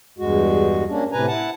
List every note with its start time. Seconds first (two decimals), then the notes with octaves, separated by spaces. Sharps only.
0.18 E2 G2 G#3 F#4
0.89 A#3 C#4 D4
1.12 A2 C3 B4 G#5 A#5
1.27 E4 F#5 A5